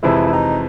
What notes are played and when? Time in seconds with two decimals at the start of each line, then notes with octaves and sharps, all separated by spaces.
0.03 F2 C3 E3 G#3 E4
0.26 E4
0.33 D#4